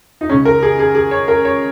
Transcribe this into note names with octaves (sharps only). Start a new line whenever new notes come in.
D#4
C#2 C#3 C#4
A#4
G#4
G#4
G#4
C#5
A#4
C#5